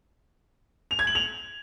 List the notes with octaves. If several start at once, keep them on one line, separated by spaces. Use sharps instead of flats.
F7
G#6
F#7
F7